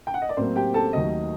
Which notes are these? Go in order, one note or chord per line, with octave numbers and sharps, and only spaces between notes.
G5
F#5
D#5
D5
A2 F#3 A#3 C4 C5
G4 G5
A4 A5
D#2 D#3 F#3 A3 D#5 D#6